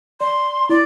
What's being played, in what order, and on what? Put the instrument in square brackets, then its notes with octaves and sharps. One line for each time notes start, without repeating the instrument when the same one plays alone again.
[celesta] D5 [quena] C6
[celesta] E4 [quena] D5